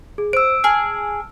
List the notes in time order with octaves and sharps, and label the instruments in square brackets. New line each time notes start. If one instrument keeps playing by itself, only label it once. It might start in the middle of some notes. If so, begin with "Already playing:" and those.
[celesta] G#4
[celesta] C5 [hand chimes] E6 D7
[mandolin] G#4 [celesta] A5 F6